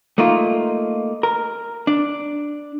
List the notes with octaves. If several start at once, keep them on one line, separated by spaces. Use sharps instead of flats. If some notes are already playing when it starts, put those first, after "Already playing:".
A3 A#3 D#4 F4
A#4
D4